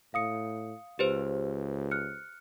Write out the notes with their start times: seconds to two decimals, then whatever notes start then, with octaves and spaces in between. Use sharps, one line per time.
0.14 A2 F5 D#6 C#7
0.99 C#2 G4 B4 C5
1.91 F6 F#6 C#7